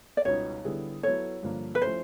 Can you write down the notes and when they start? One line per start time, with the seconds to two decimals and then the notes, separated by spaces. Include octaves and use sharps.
0.17 D5
0.25 C#2 B2 G3 B3 D#4 C#5
0.64 D3 G3 B3 E4 G#4
1.03 F#3 B3 E4 A4 C#5
1.43 G2 D3 F3 A#3 D4
1.75 B4
1.81 F3 A3 C#4 E4 C5